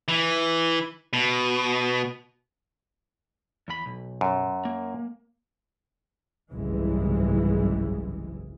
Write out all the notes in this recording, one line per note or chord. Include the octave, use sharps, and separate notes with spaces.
E3
B2
E2 B5
B1
F#2
A#3
F#1 C2 G#2 E3 G#3